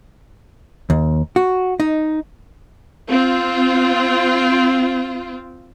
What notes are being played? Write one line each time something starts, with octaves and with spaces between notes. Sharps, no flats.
D#2
F#4
D#4
C4 F4